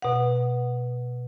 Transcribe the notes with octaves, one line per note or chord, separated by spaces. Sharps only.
B2 F#5